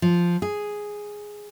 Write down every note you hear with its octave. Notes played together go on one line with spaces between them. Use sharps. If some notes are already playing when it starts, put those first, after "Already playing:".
F3
G#4